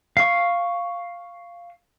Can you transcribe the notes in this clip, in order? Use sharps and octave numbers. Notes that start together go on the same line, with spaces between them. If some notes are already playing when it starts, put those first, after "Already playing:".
F5 C#6